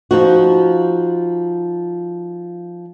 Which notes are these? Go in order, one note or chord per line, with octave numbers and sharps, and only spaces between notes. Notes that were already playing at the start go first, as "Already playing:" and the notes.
F3 D#4 F#4